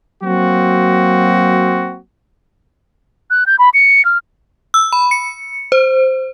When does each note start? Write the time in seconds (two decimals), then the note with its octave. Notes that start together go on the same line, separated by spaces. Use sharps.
0.23 F#3 A#3 C4 F#4
3.30 F#6
3.46 G6
3.59 B5
3.74 C#7
4.05 F6
4.74 E6
4.93 B5
5.11 C#7
5.72 C5